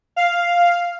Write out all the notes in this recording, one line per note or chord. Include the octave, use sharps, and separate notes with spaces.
F5